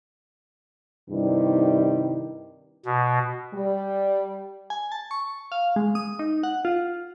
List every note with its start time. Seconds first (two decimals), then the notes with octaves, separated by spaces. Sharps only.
1.10 G2 C3 D#3 G3 E4
2.85 B2
3.54 G3
4.70 G#5
4.92 A5
5.11 C#6
5.52 F5
5.76 G#3
5.95 D#6
6.19 D#4
6.43 F#5
6.65 F4